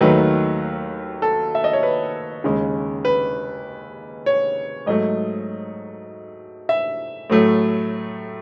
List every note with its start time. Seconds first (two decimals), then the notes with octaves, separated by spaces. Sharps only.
0.01 D#2 D#3 F#3 A3 B4
1.22 A4
1.55 E5
1.64 D#5
1.73 C#5
1.83 B4
2.44 D#2 C#3 G#3
3.05 B4
4.26 C#5
4.86 G#2 F#3 A3 D#5
6.69 E5
7.30 A2 F#3 A3